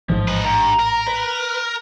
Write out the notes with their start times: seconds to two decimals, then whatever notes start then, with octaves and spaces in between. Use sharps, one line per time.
0.10 A1 G#2 E3 F3
0.28 D#4 B4
0.45 G2 A#5
0.79 A#4
1.08 B4